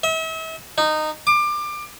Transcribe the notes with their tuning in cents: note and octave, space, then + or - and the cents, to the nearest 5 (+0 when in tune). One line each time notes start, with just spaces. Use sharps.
E5 -40
D#4 -15
D6 +25